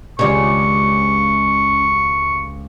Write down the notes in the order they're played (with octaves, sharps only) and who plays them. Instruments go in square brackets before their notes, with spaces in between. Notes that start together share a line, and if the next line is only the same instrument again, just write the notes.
[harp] C#2 G4 C#5 [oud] C#3 D4 [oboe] C#6